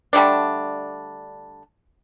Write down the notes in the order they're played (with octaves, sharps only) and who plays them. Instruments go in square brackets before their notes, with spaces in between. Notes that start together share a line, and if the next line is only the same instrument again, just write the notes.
[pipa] D3 G3 A3 D4